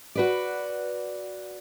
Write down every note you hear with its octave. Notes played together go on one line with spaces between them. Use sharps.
F#4 B4 D5